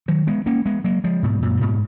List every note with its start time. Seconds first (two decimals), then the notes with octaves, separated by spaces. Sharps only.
0.08 D#3 F#3
0.27 G#3 B3
0.46 A#3 C#4
0.66 G#3 B3
0.84 F#3 A#3
1.04 F3 G#3
1.23 G#2 B2
1.42 F#2 A#2
1.61 G#2 B2